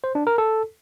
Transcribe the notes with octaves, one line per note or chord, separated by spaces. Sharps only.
C5
D4
A#4
A4